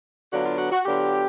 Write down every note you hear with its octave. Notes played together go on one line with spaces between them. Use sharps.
D3 F#3 B3 D4 F4 F#4
F4
F#4
F#4
D3 F#3 B3 D4 F4 G4